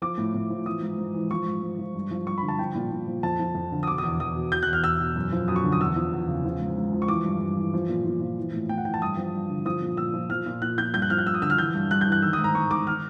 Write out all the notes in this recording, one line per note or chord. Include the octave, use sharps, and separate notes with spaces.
F3 D6
A2
A2
F3
E3 D#6
G#2
G#2
E3
F3 C#6
G#2
G#2
F3
G2
F3
G2 C#6
B5
D3
A5
F3 G5
A#2
A#2
F3
F2 A5
F3
F2
D3
D#6
B2 D6
D#6
E2
E2 D#6
B2
B2 G6
F#6
E2
F6
E2 E6
B2
F#2
F3
F#2 D#6
C#6
D3
D#6
E2 E6
F3
E2
C#3
F3
G#2
G#2
F3
C#6
E3 D6
G2
G2
E3
F3
A#2
A#2
F3
E3
A2
A2 G5
F#5
E3 G5
A5
G2 D#6
F3
G2
D3
F3 D#6
A#2
A#2 E6
F3
F3 F6
A#2
A#2 F#6
F3 G6
G2 G6
F#6
F3 F6
F#6
G2 E6
D#6
D3 E6
F6
E3 G6
G2
G2 F#6
G6
E3
F#6
D#3 E6
D#6
G#2
A#5
G#2 C#6
D#3 D6
F6